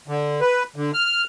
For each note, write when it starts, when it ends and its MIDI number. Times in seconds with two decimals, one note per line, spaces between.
0.08 0.40 50
0.41 0.63 71
0.76 0.91 50
0.94 1.24 89